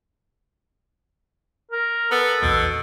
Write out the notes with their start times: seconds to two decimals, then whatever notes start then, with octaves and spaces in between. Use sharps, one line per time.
1.72 A#4
2.12 B3 A4
2.42 A#1 E2 B2